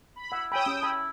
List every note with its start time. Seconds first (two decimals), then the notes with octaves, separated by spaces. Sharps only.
0.16 B5
0.32 E4 F#5 E6
0.52 C#5 G5 G#5 B5 D#6 E6
0.66 C#4 G4
0.82 E4 A5 B5